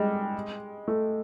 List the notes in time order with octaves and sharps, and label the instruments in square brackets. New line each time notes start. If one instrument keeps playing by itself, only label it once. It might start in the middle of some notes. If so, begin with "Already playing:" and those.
Already playing: [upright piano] G3 G#3
A3